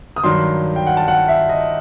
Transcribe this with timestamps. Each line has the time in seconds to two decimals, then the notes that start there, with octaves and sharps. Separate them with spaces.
0.16 D#6
0.24 G2 D#3 F#3 C6
0.76 G5
0.87 F#5
0.97 A5
1.08 F#5
1.28 E5
1.49 D#5